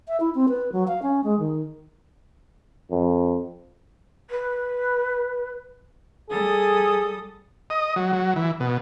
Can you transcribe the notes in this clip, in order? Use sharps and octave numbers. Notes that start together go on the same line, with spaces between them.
E5
E4
C4
B4
F#3
F5
C#4
G#3
D#3
F2
B4
G3 G#4 A4 D#6
D#5
F#3
F#3
E3
B2